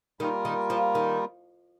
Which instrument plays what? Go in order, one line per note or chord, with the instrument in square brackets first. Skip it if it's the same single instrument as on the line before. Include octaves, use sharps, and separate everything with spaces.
[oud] D#3 [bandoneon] G3 A#3 F4 A#4
[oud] D#3
F3
D#3